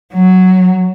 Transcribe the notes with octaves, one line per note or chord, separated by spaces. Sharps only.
F#3